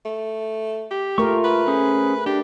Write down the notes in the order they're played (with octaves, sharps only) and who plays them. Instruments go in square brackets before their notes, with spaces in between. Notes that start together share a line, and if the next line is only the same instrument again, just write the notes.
[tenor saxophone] A3
G4
[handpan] A3 A#4 [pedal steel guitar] F4 C#6
[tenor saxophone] B4
[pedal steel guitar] C#4 G#4 C5
[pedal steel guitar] D4 [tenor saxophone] G4